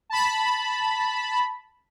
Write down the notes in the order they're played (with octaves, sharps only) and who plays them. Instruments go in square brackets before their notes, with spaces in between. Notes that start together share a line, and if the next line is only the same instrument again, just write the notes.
[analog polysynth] A5 B5